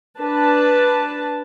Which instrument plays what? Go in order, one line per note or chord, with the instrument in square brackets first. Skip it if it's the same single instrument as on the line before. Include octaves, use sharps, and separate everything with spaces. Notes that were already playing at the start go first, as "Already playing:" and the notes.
[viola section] D4 B4 A5